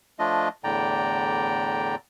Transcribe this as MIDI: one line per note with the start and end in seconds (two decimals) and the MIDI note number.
0.19 0.48 53
0.19 0.48 57
0.19 0.48 62
0.19 0.48 65
0.19 0.48 75
0.64 1.96 40
0.64 1.96 45
0.64 1.96 50
0.64 1.96 74
0.64 1.96 79
0.64 1.96 82